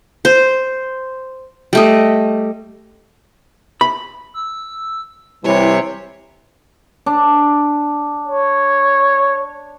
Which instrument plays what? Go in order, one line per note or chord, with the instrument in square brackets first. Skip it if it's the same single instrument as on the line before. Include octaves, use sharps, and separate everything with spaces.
[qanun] C5
G3 A3 D#5
[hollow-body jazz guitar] B5
[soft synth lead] E6
[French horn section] C3 E3 G3 [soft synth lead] E4 [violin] C#5
[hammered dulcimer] D4
[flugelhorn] C#5